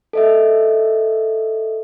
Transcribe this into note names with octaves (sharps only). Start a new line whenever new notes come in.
A4 D#5 E5